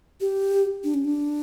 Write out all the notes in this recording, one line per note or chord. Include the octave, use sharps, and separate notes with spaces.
G4
D4
C#4
D4